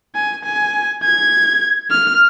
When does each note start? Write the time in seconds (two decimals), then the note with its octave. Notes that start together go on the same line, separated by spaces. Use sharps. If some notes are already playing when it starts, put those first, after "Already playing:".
0.15 G#5
0.45 G#5
1.03 G#6
1.91 F6